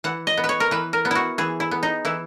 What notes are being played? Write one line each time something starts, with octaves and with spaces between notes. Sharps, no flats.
E3 F#5
D#5
B3
B4
C#5
A#4
E3 B4
A#4
B3
E4 F#4
E3 G#4
E4
B3
D#4
E3 E4